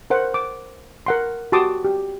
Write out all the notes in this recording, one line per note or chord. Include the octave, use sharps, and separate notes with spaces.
A#4 C5 F#5
D6
A#4 F#5 C6
F#4 G4 A5 C6 D6 D#6
G4